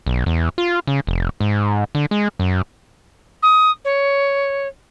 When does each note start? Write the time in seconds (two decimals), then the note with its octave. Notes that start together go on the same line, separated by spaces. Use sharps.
0.06 B1
0.26 E2
0.58 F4
0.87 C#3
1.07 F1
1.40 G#2
1.95 D3
2.11 G#3
2.39 F#2
3.42 D#6
3.84 C#5